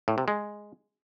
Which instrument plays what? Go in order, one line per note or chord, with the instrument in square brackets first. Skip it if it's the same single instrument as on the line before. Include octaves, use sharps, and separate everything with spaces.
[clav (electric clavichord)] A2
C3
G#3